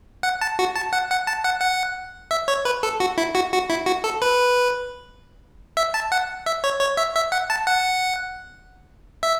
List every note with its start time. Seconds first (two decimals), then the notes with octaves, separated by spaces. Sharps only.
0.23 F#5
0.41 A5
0.59 F#4
0.76 A5
0.93 F#5
1.10 F#5
1.27 A5
1.44 F#5
1.61 F#5
2.31 E5
2.48 C#5
2.65 B4
2.83 A4
3.00 F#4
3.18 E4
3.35 F#4
3.53 F#4
3.70 E4
3.86 F#4
4.04 A4
4.22 B4
5.77 E5
5.94 A5
6.12 F#5
6.46 E5
6.64 C#5
6.81 C#5
6.97 E5
7.15 E5
7.32 F#5
7.50 A5
7.67 F#5
9.23 E5